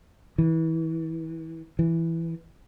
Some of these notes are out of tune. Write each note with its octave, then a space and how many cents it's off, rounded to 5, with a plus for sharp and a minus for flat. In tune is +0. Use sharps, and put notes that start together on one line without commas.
E3 -25
E3 +5